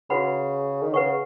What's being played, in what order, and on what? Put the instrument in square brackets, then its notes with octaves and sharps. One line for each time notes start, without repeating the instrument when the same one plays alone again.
[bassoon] C#3 [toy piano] F#4 B4 F#5 B5
[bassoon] D#3
[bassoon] C#3 [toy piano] B4 F#5 C#6